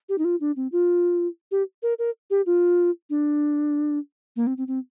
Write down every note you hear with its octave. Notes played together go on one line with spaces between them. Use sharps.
G4
D#4
F4
D4
C4
F4
G4
A#4
A#4
G4
F4
D4
A#3
C4
C4
C4